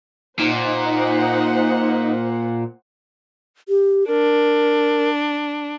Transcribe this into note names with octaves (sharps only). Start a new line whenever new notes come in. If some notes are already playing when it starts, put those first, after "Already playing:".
A#2 D#4 C5 F#5
G4
D4 A#4